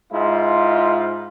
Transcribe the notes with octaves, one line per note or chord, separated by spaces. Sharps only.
G#2 G#3 E4 F4